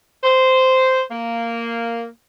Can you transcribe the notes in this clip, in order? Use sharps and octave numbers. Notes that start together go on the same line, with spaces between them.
C5
A#3